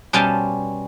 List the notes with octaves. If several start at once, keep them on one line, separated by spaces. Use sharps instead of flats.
B2 G3 C#4 C5 F5 A5